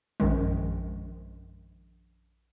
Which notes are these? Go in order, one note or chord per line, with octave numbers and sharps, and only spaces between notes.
A#1 F#2 D#3 G#3